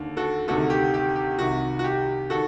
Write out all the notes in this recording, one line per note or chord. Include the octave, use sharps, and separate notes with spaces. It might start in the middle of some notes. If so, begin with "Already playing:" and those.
Already playing: D#2 D3
F#4 A4
D2 C3 D#3 F#4 A4
G4
G4
G4
C2 C3 D#3 F#4
F#4
G4
D#3 F#4 A4